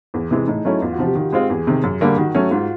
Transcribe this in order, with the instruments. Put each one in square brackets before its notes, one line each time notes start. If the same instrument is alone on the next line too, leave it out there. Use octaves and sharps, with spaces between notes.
[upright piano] E2 [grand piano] G#4
[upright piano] C3 E3 G#3
[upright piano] A2 [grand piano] D#4
[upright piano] F#3 A3 C#4 E4
[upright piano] E2 [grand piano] F4
[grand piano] F#4
[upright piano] C3 F3
[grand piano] G4
[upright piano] D#3 [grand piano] G4
[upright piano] G#3 C4 F4
[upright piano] E2 [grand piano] G#4
[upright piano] C3 D#3
F#2
[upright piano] D3 G3 A#3 [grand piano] G4
[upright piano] D#3 [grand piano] F#4
[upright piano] F#3 A3 C#4
[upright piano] G#2 [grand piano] F4